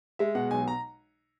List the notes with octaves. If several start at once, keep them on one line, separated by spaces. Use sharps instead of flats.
G#3 E5
B2 F#5
B1 G#5
A#5